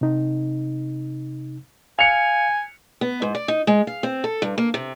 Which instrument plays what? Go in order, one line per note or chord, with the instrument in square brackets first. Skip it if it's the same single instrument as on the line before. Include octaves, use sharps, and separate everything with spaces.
[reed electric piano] C3 D#4
[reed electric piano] F5 [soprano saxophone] G#5 [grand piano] C#7 F7
[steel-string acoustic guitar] B3
G#2
D5
D#4
G#3
F5
C4
A4
G2
A#3
C3